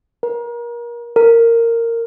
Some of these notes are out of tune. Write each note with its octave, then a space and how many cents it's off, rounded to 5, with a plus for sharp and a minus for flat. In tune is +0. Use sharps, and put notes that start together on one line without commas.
A#4 +30
A#4 -15